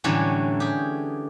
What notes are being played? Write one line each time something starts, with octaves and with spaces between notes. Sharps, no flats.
A2 D3 E3 F#3 G3 C#4
G4 G#4